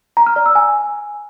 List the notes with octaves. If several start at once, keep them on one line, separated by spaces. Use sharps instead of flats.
A#5
F6
D5
E6
G#5